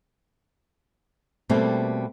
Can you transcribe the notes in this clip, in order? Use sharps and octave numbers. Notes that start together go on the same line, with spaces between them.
B2 G3 A3 A#3 C4